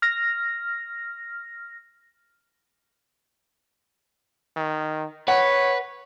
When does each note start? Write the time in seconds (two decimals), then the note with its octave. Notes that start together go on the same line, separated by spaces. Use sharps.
0.02 F6 A#6
4.56 D#3
5.28 B4 C#5 F#5